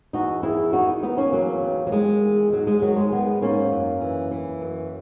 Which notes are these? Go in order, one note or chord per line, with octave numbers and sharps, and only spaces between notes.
E2 D#4 F#4
D#3 E4 G#4
D#3 D#4 F#4
E2 B3 D#4
A#3 C#4
E2 F#3 A#3
D#3
F#3
D#3 G#3
E2
G#2 F#3
G#3
D#3 F#3
G#3
D#3 G#3 B3
G#2 A#3 C#4
F#2
E3
E3
F#2